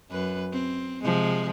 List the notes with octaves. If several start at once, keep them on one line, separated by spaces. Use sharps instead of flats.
F#2 B4
C4
C3 F3 G#3